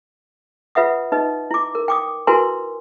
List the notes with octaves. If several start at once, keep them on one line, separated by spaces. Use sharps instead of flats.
F4 B4 E5 F#5 D#6
D#4 B4 D#5
E4 D6
A#4
G5 D6 D#6
E4 F#4 A#4 B4 G#5 C6